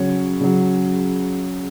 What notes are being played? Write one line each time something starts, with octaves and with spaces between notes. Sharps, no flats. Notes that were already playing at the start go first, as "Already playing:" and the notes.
Already playing: C#3 F#3 C#5
C#3 F#3